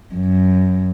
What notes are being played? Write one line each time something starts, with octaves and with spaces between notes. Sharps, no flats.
F#2